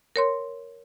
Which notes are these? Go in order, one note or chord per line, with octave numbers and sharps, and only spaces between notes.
A#4 C#5 C6